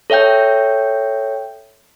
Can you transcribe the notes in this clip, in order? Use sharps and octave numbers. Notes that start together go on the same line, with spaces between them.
A4 C#5 E5 G5 G6